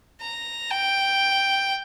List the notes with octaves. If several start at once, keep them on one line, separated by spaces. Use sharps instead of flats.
A#5
G5